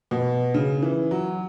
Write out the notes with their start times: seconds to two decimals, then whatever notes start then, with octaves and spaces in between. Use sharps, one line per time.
0.11 B2
0.54 C#3
0.82 E3
1.11 F#3